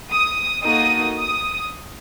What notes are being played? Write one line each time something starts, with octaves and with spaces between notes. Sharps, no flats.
D#6
A#3 D#4 F#4 A4 D#6
D#6